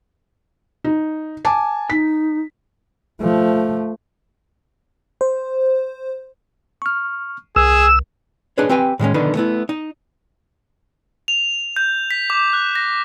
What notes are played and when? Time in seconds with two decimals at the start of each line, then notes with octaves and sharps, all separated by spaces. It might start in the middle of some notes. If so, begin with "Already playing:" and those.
0.84 D#4
1.45 G#5 A5 D6
1.90 D#4 B6
3.21 F3 A3
5.21 C5
6.82 C#6 F6
7.56 C2 G#4 E6
8.58 D4 D#4 G#4 B4 C#5
8.69 C4 G4 B4 G5 G#5
8.99 A2 D#3 G#3 C#4
9.14 B1 D3 D#3 B3 D#4 B4
9.35 A3 B3 E4
9.69 D#4
11.28 F7
11.76 G6
12.11 B6
12.30 D6
12.53 F#6
12.75 A#6